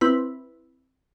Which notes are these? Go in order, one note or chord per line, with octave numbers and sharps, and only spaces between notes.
C4 E4 B4